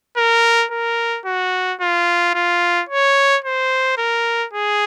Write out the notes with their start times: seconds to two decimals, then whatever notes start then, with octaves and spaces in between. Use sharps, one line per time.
0.17 A#4
0.71 A#4
1.26 F#4
1.81 F4
2.34 F4
2.89 C#5
3.44 C5
3.98 A#4
4.53 G#4